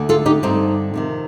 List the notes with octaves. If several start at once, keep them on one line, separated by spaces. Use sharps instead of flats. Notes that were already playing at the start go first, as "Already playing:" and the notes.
Already playing: D2 D3
F4 A4
D#4 G4
G2 D3 C4 D#4
F2 C3 D#3